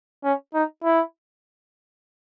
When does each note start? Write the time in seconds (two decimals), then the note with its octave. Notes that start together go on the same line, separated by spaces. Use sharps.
0.24 C#4
0.54 D#4
0.84 E4